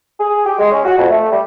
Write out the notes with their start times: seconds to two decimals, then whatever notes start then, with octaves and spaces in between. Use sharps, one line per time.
0.20 G#4
0.46 G4
0.59 G#3
0.72 C#4
0.85 F#4
0.98 F2
1.10 A3
1.31 G3